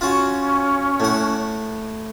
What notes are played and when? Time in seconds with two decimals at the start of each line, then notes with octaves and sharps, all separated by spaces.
0.01 C#4 F4 F#4
1.00 A2 F#5